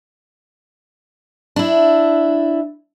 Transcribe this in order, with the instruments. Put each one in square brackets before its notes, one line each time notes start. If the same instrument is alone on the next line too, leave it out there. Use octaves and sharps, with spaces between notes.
[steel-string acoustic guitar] D4 E4